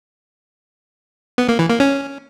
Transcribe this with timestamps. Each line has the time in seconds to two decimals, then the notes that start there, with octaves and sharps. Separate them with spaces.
1.38 B3
1.49 A#3
1.59 E3
1.70 A#3
1.80 C#4